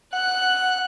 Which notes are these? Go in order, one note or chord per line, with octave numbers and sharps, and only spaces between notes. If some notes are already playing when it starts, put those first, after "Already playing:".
F#5 F#6